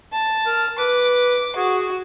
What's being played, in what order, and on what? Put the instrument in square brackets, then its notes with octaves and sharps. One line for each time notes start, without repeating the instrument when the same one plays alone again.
[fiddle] A5
[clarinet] A#4
[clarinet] B4 [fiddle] D6
[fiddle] F#4 [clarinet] G#4